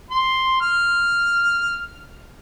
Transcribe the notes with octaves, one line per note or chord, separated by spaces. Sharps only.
C6
F6